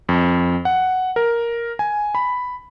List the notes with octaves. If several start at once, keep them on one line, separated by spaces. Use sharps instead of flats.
F2
F#5
A#4
G#5
B5